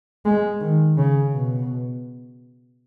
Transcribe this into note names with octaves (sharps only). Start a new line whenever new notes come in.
G#3
D#3
C#3
B2